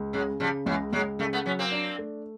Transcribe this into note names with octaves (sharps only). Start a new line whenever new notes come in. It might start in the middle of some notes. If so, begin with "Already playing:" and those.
Already playing: C#2
C#3 F#3 G#3
C#3 F3 G3
C#2 E3 F#3
C#2 F#3 G#3
C#3 G3 A3
A3 B3
F#3 B3 C#4
A#3 C4
D4
A3